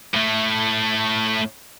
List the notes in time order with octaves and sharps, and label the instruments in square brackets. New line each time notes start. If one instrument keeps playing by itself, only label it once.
[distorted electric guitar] A2 A3